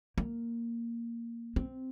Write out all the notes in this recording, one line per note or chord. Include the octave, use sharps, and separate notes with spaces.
A#3
C4